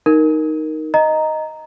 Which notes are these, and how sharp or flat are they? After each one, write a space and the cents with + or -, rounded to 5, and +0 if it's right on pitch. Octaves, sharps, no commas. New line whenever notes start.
D#4 +0 A#4 +0
D#5 +0 A#5 -5